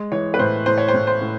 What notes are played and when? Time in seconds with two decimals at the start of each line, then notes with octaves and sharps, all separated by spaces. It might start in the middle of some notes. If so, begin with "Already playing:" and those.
Already playing: G#3
0.12 E3 C#5
0.34 B4
0.39 A2 C5
0.66 A2 C5
0.78 C#5
0.88 C5
0.94 A2
1.07 C5
1.22 A2